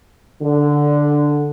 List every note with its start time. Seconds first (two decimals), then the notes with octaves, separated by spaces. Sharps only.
0.42 D3